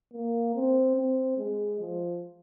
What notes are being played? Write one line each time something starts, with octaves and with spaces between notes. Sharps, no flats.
A#3
C4
C4
G#3
F3